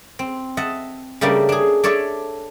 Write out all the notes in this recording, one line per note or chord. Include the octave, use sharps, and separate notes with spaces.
C4
D#5 E5 F#5 A5
C#3 G3 A3 A#3 D4
D4 G#4
D4 A4 C#5 D5 E5 G#5